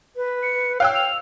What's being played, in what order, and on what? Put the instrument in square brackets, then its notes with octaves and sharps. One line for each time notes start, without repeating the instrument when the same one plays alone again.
[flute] B4
[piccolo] C#7
[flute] C#5 [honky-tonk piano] F5 G5 E6 [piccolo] F#6
[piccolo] F7